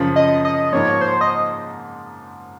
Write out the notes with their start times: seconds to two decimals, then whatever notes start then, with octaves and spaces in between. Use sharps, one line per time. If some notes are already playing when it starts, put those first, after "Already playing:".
Already playing: F#2 C#3 F3
0.16 D#5
0.45 D#5
0.72 G#2 F3 A#3 C#5
1.01 C5
1.21 D#5